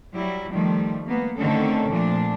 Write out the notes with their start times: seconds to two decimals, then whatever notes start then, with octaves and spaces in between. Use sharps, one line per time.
0.13 F#3 G3 E4
0.51 D#3 F3 G3 A3
1.07 A#3 B3
1.39 D3 D#3 A3 C4 C#4 A4
1.89 A#2 F3 A3 D4